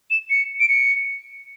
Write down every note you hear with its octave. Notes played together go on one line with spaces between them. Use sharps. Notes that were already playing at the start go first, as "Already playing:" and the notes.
E7
C#7
D7
C#7